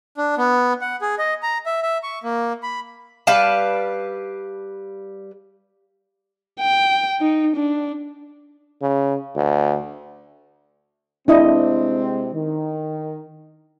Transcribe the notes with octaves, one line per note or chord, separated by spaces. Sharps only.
D4
B3
F#5
G#4
D#5
A#5
E5
E5
C#6
A#3
B5
G3 B4 F5 A5
G5
D#4
D4
C#3
D2
C3 G#3 C4 D4 E4 D#5
D#3